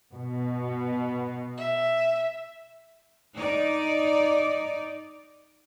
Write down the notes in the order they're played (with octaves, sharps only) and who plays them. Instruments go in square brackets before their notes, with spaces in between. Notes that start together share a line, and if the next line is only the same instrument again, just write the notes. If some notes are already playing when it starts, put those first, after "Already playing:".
[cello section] B2
[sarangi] E5
[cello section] D#4 D5